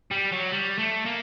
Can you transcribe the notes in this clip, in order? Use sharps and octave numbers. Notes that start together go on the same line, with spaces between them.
G3
F#3
G3
A3
A#3